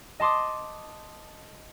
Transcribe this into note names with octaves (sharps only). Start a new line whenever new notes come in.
D#5 A5 C6 D6 D#6